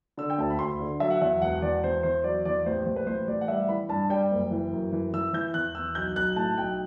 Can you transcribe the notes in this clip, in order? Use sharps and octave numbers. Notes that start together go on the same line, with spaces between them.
D3 E6
G5
D2 A5
B5
D2 C6
D3
F#3 E5
F#5
E2 E5
E1 F#5
E2 D5
E2 C5
E2 C5
F#3 D5
E2 D5
A1 C5
A1 C5
B4
A1 C5
A1 D5
F#5
G3 E5
E3 B5
G2 A5
G3 G5
F#1
E3
F#2
E3
E3 E6
E3 G6
E2 F#6
E2 E6
B1 G6
B1 F#6
A2 A5
B1 G5